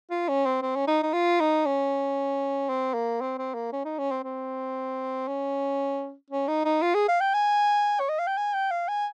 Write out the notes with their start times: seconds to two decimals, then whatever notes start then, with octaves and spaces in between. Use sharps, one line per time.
0.10 F4
0.28 C#4
0.46 C4
0.62 C4
0.76 C#4
0.87 D#4
1.03 D#4
1.13 F4
1.40 D#4
1.66 C#4
2.69 C4
2.94 A#3
3.21 C4
3.38 C4
3.54 A#3
3.72 C#4
3.85 D#4
3.98 C#4
4.11 C4
4.24 C4
5.28 C#4
6.30 C#4
6.48 D#4
6.65 D#4
6.82 F4
6.94 G#4
7.08 F5
7.20 G5
7.34 G#5
8.00 C#5
8.09 D#5
8.19 F5
8.27 G5
8.37 G#5
8.54 G5
8.71 F5
8.88 G#5